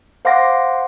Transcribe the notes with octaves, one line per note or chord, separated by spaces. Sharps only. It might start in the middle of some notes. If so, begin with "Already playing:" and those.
C5 F5 F#5 C6 D6 A#6